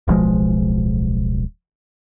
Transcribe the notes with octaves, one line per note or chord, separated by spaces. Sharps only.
D1 B1 F3 G#3